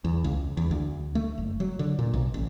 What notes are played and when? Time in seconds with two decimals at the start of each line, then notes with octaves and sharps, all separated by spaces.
0.04 E2
0.24 C#2
0.57 E2
0.71 D2
1.15 A3
1.38 F#1
1.60 F#3
1.79 D3
1.99 A#2
2.14 B1
2.34 A1